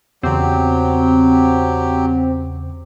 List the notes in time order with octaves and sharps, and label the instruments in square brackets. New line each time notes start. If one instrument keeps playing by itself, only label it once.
[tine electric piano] E2 C#3 [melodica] F#3 G4 [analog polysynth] C4